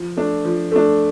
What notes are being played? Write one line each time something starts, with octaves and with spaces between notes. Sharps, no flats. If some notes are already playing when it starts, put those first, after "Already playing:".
Already playing: F3
A3 D4
F3
A3 D4